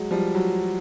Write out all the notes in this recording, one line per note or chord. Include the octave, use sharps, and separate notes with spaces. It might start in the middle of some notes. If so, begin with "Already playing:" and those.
Already playing: F#3 G#3
F3 G3
F#3